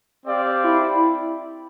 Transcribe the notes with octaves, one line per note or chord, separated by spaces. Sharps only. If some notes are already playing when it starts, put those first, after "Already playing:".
C4 G4 D5 F5
E4